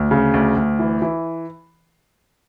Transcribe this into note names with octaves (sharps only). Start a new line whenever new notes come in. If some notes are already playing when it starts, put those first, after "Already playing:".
Already playing: D2
C#3
D2
D2
E3
E3